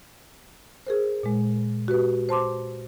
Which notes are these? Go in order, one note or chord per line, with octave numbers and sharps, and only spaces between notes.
G#4 A#4 C5
A#2 G#3
F#4 G4 B4
C5 A5 C6 D6